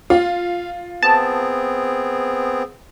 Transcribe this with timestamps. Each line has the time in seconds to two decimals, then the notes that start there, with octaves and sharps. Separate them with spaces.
0.10 F4 F5
1.03 B3 C4 G#4 A5